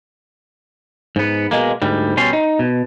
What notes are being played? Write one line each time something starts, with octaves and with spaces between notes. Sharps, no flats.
G#2 B3
B2 G#3 A#3
D2 G#2 G3
B2 G3 C#4 C6
D#4
B2